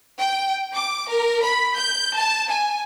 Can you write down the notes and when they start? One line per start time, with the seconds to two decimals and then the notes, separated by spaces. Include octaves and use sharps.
0.18 G5
0.74 D6
1.09 A#4
1.42 B5
1.76 G6
2.16 A5
2.49 G#5